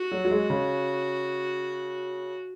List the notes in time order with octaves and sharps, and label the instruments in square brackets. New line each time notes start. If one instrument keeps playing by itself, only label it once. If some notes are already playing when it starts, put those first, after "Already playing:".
Already playing: [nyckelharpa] F#4
[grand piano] F#3
F#3
G#3
C#3